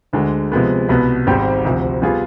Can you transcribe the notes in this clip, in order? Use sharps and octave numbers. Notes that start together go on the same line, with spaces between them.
D2 D3 G#3
C3 F3 G#3 B3
C2 B2 B3
G#1 G#2 G3 C4 G4
D2 C3 F3
G3 B3 F4 G#4